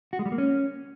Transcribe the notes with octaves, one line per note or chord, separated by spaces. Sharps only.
F#4
G#3
G3
A#3
C#4